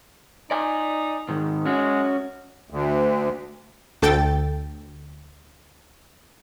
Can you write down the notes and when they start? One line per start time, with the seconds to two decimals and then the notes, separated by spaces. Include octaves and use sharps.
0.51 D#4 D5 G#5
1.28 G#2 D#3
1.66 G#3 C#4 F#4
2.70 D2
4.02 D2 A4 G5 A6